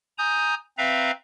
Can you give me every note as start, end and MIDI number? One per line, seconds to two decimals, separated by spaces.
0.18 0.54 80
0.18 0.54 82
0.18 0.54 87
0.18 0.54 91
0.78 1.11 60
0.78 1.11 71
0.78 1.11 76
0.78 1.11 77
0.78 1.11 82